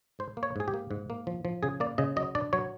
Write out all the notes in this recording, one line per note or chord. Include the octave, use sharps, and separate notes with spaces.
G#2 C5
A#3
C#5
G#2 G#4
G4
A#3
G#2
A#3
F3
F3
C#3 G#4
A#3 D5
C#3 D#5
F#3 D#5
D4 D5
F#3 C#5